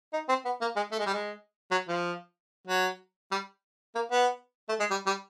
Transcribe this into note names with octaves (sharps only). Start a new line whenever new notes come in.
D#4
C4
B3
A#3
G#3
A3
G#3
G3
G#3
F#3
F3
F#3
G3
A#3
B3
A3
G#3
G3
G3